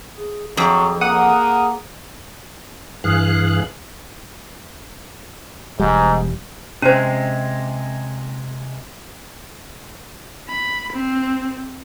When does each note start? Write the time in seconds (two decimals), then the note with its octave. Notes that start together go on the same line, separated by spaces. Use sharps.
0.17 G#4
0.57 F2 F#3 G#4
1.01 A#3 F#5 D#6
3.04 G2 E3 G#4 F5 F#6
5.80 E1 G#2 G3
6.82 C3 G#3 C#4 C5
10.48 B5
10.93 C4